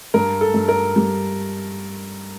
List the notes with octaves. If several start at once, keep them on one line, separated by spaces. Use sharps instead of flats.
G2 A#4
A4
G2
A#4
G3